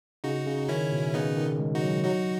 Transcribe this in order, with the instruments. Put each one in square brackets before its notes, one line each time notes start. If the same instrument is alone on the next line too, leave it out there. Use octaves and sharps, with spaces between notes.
[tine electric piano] C#3 [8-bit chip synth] D#4 F#4
[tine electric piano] C#3
[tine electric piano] D#3 [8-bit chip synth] C#4 E4
[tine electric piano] B2
[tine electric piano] C#3 [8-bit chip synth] B3 D#4
[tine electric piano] D#3
G#3
[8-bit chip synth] D#4 F#4
[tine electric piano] F#3
[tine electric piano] F#3 [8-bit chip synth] D#4 F#4